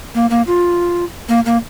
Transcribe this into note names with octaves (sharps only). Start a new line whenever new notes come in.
A#3
A#3
F4
A#3
A#3